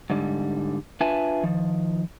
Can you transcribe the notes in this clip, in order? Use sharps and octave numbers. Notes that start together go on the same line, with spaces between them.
G#2 D3 G3
D4 F4 B4 E5 G#5 A5
D#3 F3